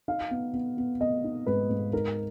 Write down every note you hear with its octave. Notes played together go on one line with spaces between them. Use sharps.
D#4 F5
B3
B3
B3
B3 D#5
D#4
G#2 B4
G#2
D#4 A#4